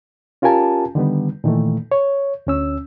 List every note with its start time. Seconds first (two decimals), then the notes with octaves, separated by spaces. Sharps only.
0.42 C#4 F4 G4 A#4 G#5 A5
0.95 D3 D#3 G3 B3
1.44 A#2 D#3 E3 A3
1.92 C#5
2.47 D2 C#4 E6